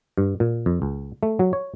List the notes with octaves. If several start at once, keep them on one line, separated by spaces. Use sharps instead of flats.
G2
A#2
F2
C#2
A3
F#3
C#5